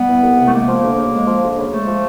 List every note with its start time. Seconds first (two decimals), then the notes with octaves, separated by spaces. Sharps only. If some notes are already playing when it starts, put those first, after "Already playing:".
Already playing: G3 B3
0.09 E3
0.23 C2
0.38 C3
0.46 A3
0.54 G#3 A#3
0.69 F3
0.83 D2
0.98 C#3
1.13 G#3
1.28 F3
1.43 D2
1.58 C#3
1.73 G#3 A3
1.88 F3